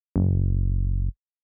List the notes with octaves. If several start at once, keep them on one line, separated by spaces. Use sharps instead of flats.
F#1